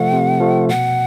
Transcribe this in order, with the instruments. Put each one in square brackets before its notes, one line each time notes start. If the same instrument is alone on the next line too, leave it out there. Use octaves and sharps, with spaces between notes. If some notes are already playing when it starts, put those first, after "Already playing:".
Already playing: [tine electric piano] C3 F3 A3 [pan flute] F#5
[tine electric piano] C3
F3 A3
[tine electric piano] B2 [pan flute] F#5